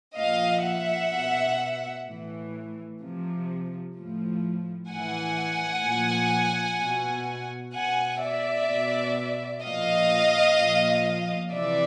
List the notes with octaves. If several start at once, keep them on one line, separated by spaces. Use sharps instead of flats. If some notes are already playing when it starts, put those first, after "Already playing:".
A#2 F3 D#5 F5
E5 F#5
B2
A2 E3
C3 F3
A2 F3
A2 E3 F#5 G#5
A#2 F3
B2
B2 F#5 G#5
D5 E5
B2
A#2 F3 D#5 F5
A#2 F3
C3 E3 D5 E5